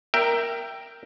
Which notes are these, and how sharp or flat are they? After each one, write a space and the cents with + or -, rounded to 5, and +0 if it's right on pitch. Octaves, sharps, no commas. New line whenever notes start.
A#4 +0 E5 +20 G5 +0